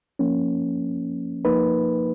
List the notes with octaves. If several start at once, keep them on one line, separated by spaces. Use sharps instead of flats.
F3 A#3 C#4
F3 A#3 D#4 B4